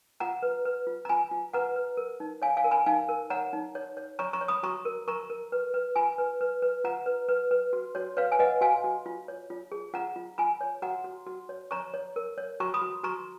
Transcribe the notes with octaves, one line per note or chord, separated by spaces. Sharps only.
F4 F#5 A#5
B4
B4
F4
A#5
F4 G#5 B5
F4
B4 F#5 A#5
B4
A#4
D#4
C#5 F5 G#5
F5 G#5
A#4
G#5 B5
D#4 F5 G#5
A#4
C#5 F#5 A#5
D#4
C#5
C#5
C#5 A#5 C#6
A#5 C#6
C#5
B5 D#6
F#4 A#5 C#6
A#4
A#4 A#5 C#6
A#4
B4
B4
F4 G#5 B5
B4
B4
B4
F4 F#5 A#5
B4
B4
B4
F#4
F#4 C#5
B4 C#5 F5
G#5
B4 D#5 F#5
F#4 F5 G#5
F#4
F4
C#5
F4
G#4
F4 F#5 A#5
F4
F4 G#5 B5
C#5
F#4 F#5 A#5
F#4
F#4
C#5
C#5 A#5 C#6
C#5
A#4
C#5
F#4 A#5 C#6
B5 D#6
F#4
F#4 A#5 C#6